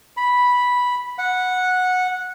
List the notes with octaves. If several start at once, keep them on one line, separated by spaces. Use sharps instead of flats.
B5
F#5